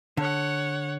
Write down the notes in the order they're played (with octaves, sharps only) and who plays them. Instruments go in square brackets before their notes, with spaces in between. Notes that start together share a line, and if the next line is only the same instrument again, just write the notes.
[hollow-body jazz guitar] D3 [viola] C#5 F#5